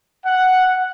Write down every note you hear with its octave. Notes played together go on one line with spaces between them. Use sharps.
F#5